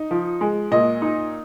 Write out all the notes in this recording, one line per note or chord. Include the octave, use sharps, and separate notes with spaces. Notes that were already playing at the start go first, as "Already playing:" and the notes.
Already playing: D#4
F3
G#3
A#2 D#5
D#4